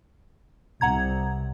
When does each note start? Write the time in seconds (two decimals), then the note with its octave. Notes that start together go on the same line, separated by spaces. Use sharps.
0.81 C2 F#5 A#5 G#6